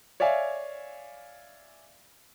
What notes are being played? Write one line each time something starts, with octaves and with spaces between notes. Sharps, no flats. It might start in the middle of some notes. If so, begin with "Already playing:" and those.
C#5 D5 E5 F5 G#5